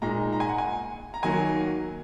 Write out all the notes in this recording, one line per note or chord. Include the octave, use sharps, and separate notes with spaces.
A#2 G#3 D#4 A#5
A#5
G#5
F#5
G#5
A#5
D#3 F#3 A#3 G#5